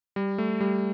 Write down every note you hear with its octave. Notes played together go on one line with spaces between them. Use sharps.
G3
A3
G3